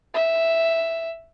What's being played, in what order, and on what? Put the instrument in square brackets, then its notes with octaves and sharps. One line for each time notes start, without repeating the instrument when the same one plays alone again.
[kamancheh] E5